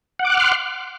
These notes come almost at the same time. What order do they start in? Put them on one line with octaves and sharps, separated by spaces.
F#5 D6 F#6 F6 C6